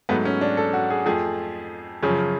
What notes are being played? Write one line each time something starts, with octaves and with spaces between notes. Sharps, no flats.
G#2 F#3 A3 B3
C#4
D4
A4
F#4
G#4
F2 F3 A3 G#4
F#2 C#3 F3 C#4